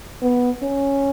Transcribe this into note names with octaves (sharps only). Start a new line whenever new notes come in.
B3
C#4